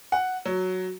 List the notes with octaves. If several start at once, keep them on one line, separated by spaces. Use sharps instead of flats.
F#5
F#3